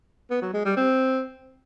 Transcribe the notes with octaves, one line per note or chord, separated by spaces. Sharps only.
B3
F#3
G#3
G3
C4